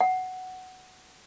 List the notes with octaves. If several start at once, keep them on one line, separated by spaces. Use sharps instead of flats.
F#5